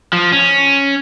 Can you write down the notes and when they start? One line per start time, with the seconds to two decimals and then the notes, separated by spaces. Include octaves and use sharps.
0.13 F3
0.32 C#4